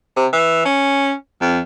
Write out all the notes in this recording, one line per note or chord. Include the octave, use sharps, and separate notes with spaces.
C3
E3
C#4
F2